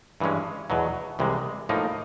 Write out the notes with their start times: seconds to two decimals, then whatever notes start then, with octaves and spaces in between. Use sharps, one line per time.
0.20 G2 E3 G#3 C#4
0.70 E2 B2 F#3
1.19 C2 C3 E3 G#3
1.69 A2 F3 A#3 D#4